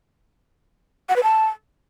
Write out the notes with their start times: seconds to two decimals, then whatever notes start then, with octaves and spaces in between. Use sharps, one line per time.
1.09 F#5
1.16 B4
1.23 A5